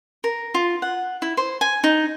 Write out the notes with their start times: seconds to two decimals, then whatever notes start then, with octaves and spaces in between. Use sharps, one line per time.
0.24 A#4
0.54 F4
0.82 F#5
1.22 E4
1.37 C5
1.61 G#5
1.84 D#4